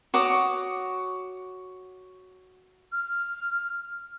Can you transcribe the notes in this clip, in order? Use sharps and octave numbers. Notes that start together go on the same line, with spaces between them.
F#4 C#5 D6 D#6
F6